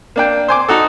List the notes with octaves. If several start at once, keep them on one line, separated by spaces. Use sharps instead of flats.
A#3 D4 G5
C5 G#5 D6
D#4 F#4 A4